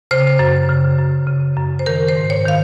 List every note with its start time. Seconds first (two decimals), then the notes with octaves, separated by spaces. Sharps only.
0.11 C#3 C5
0.39 F#2
0.69 C#3
0.99 F#2
1.27 C#3
1.57 F#2
1.79 C5
1.86 D#3 A#4
2.09 C5
2.16 G#2
2.30 C#5
2.46 D#3 F5